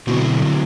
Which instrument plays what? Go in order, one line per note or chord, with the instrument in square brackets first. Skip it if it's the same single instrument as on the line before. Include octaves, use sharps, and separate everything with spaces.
[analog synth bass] B2 [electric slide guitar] D3 F#3 A3 C4 E4